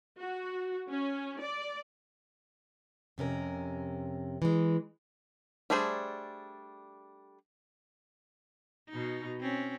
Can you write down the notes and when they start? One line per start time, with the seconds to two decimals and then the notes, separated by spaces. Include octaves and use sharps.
0.19 F#4
0.90 C#4
1.40 D5
3.18 F2 C3 C#4 A#4
4.42 E3 G#3
5.70 G3 A3 D4 G#4 C5
8.89 B2 D#4
9.40 C4 C#4